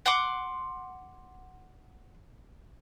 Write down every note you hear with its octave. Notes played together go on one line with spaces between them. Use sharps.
F#5 C6 D6